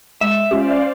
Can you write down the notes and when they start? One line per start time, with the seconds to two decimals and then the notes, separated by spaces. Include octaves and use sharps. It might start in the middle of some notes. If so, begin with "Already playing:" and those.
0.21 G#3 E5
0.51 G#3 C#4 F4 G4 C5 D5 F5